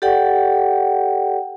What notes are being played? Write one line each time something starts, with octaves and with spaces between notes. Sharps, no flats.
G4 A4 D5 F#5 G5